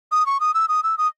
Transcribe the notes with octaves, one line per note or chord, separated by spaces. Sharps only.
D#6
C#6
D#6
E6
D#6
E6
D#6